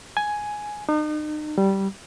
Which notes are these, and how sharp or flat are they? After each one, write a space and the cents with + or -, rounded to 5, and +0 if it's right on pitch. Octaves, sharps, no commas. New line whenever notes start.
G#5 +5
D#4 -40
G3 -10